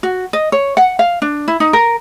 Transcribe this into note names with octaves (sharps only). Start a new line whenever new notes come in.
F#4
D#5
C#5
F#5
F5
D4
E4
D#4
A#4